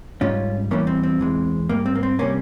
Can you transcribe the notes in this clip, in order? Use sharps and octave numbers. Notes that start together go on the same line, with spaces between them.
G#2 G3 C#4 F4
E2 E3 G3 A#3 C#4
C4
C4
E2 E3 G#3
G#2 G3 A#3
C4
A#3
C4
C3 G3 A#3 C#4